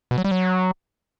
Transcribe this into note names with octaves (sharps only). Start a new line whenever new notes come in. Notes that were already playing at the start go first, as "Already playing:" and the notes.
B2
F#3
G3
F#3